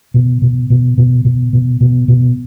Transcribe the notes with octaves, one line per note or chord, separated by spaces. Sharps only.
B2
B2
B2
B2
B2
B2
B2
B2